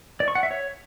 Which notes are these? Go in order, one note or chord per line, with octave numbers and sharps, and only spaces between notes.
D5
C#6
F#5
E5
C#5